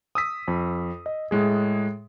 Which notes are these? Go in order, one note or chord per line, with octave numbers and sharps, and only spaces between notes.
D#6 E6 B6
F2
D#5
A2 G#3 G#4